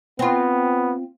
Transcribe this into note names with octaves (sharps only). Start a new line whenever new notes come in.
B3 C4 F4